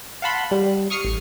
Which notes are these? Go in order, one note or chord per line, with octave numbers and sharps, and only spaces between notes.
F5 F#5 A5 B5 C6
G3
C#6 D#6 F6 C7 C#7
A1